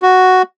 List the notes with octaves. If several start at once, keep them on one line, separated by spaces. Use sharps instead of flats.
F#4